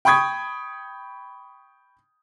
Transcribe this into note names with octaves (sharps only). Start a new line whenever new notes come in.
G5 B5 C#6 D#6 G#6